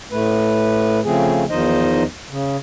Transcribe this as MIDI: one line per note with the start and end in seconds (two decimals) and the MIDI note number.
0.12 1.00 45
0.12 1.00 57
0.12 1.00 71
1.05 1.44 49
1.05 1.44 53
1.05 1.44 57
1.05 1.44 60
1.05 1.44 68
1.50 2.03 40
1.50 2.03 51
1.50 2.03 53
1.50 2.03 63
1.50 2.03 72
1.50 2.03 75
2.31 2.57 49